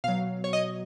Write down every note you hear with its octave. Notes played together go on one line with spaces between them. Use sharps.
B2 F#3 F5
C#5
D#5